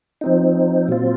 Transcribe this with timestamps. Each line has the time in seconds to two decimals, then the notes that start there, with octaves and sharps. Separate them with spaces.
0.21 F3 C4 D#4
0.88 A#2 F#3 C4 F4